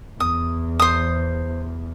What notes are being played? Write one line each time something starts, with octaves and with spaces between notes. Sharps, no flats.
E2 D#6
C5 D#6